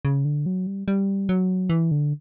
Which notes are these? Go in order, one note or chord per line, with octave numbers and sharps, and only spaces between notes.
C#3
D3
F#3
G3
G3
F#3
E3
D3